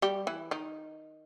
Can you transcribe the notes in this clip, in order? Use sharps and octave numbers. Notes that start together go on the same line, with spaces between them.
G3 G4
E3 E4
D#3 D#4